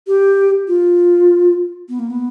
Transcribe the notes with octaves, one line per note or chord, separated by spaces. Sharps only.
G4
F4
B3
A#3
B3